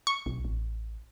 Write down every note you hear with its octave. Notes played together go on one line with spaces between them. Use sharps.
C#6
B1
A1